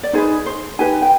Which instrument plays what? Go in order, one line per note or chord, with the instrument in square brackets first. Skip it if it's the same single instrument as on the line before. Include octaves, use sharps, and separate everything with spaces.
[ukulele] D5
D#4 G#4 B4 C5
C5
D#4 G4 B4 G#5
G5